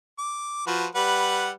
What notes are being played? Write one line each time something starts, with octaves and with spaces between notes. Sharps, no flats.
D6
F3 F#4 B4
G3 B4 F#5